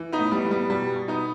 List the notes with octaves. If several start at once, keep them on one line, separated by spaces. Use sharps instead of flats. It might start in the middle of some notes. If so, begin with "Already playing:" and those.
Already playing: E3
B3 D#4
A2
G3 B3
E3
G3 B3
B2 G3
B2
B3 D#4